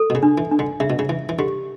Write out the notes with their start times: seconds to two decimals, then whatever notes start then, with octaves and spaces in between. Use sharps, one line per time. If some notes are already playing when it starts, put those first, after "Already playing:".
Already playing: A4
0.10 B2
0.15 C#3
0.23 D4
0.38 E3
0.52 D4
0.59 D3
0.80 C#3 E5
0.90 B2
0.99 C#3
1.09 E3 E5
1.29 E3
1.39 D3 G4